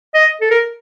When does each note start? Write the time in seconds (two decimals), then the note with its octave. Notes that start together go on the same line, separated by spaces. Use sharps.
0.14 D#5
0.41 A4
0.51 A#4